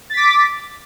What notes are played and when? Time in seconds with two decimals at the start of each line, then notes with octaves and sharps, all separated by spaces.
0.10 A6
0.13 B6
0.17 D6